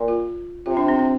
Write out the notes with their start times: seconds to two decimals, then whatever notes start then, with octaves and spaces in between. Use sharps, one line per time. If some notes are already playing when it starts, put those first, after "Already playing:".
Already playing: A#2
0.08 F4
0.66 C3 F4
0.77 D4
0.88 C4
0.99 C4